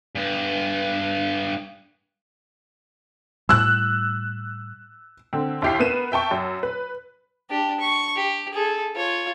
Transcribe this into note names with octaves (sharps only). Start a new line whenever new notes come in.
G2 B3
A2 G3 E6 F#6
D3 C4
D#2 E4 G4 G5 C7
B3 A#4 B4 D#7 E7
E5 G5 A5 C#6
F#2
B4
D4 G4
C#6
G4
G#4 A4
F4 C#5